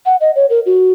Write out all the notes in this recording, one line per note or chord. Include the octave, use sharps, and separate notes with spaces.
F#5
D#5
C#5
A#4
F#4